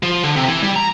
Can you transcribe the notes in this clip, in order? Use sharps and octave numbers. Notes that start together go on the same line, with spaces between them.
F3
D3
C3
E3
G3
A#5